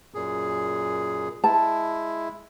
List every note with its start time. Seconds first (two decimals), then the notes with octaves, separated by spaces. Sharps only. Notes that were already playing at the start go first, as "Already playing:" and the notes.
0.14 F#2 A#2 G#4
1.44 G#3 E4 A5